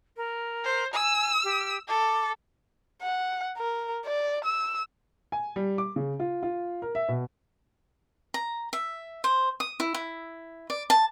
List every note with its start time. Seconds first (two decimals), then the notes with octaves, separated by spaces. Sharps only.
0.17 A#4
0.64 C5
0.94 G#5 E6
1.44 G4
1.88 A4 D6
3.02 F#5
3.58 A#4
4.05 D5
4.45 E6
5.32 G#5
5.56 G3
5.78 D6
5.96 C#3
6.20 F4
6.43 F4
6.82 A#4
6.95 E5
7.09 B2
8.34 A#5
8.73 E5
9.24 C5
9.60 D#6
9.80 E4
9.94 E4
10.70 D5
10.90 A5